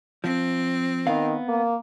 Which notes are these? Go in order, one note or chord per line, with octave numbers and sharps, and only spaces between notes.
F3 C4
D#3 B3 F5
A#3